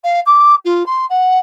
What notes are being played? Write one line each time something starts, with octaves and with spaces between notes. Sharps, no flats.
F5
D6
F4
C6
F#5